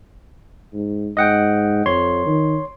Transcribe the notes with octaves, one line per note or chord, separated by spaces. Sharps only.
G#2
G#2 D#5 F#5 G5
F2 C#5 C6
D#3